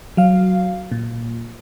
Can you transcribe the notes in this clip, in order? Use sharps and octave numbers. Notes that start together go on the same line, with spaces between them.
F#3 F5
A#2